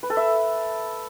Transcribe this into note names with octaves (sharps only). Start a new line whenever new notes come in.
B4
A4
E5